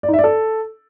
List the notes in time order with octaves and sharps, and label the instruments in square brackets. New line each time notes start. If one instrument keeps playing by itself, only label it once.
[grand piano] D5
D#4
E5
D5
A4